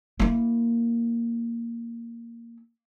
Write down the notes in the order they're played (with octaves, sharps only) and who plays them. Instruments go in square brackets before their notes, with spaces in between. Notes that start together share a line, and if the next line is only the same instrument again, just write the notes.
[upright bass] A#3 E4